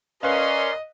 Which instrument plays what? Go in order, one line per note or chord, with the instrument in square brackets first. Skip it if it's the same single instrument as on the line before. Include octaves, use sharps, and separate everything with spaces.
[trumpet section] C#4 C6 [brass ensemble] A#4 D5 [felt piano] B4 F5 [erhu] D#5